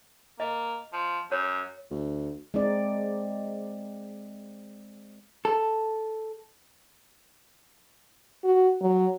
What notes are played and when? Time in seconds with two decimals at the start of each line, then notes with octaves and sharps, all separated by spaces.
0.40 A#3 D#5
0.93 F3
1.32 F#2 C#5
1.91 D2
2.54 G#3 C4 D#4 D5
5.45 A4
8.45 F#4
8.81 F#3